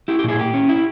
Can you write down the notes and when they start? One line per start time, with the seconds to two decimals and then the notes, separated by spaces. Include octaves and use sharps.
0.08 E4 G4
0.19 G4
0.24 A#2 E4 G#4
0.39 A#3 G4
0.54 C#4
0.69 E4